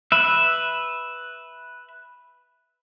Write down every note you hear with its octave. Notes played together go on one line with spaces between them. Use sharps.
B4 E5